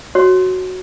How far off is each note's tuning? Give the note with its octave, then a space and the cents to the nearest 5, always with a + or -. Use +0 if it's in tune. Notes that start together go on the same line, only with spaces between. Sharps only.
F#4 +0 C#5 -20